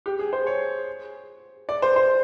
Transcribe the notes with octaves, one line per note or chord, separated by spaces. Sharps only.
G4
G#4
C5
C#5
D5
C5
C5